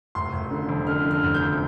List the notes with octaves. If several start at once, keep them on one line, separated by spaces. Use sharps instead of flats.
F1 C6
F1
D3
F2
D3 F6
D3
F6
F1
G6
F2